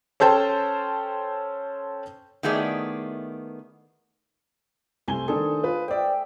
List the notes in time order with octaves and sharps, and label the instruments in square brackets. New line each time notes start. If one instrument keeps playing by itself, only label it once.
[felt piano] C#4 A4 C5 G5 A5
[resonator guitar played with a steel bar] D#3 A3 B3 E4 G#4 D5
[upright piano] C2 G#5 G7 [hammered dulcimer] A3 C5
[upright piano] D#3 D4 A4 [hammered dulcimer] G#4
[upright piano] F4 B4
[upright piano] C5 D5 [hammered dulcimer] E5 G5